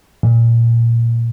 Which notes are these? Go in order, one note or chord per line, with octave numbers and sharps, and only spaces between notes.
A#2